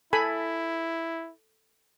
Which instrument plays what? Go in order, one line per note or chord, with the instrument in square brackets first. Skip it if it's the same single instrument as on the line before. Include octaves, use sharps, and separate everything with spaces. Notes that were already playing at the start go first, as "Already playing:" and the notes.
[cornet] E4 [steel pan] A4 G#5 B5